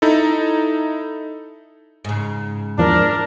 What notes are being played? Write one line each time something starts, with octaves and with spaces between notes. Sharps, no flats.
D#4 E4 A4
G#2 C#3
E2 F3 D4 A#4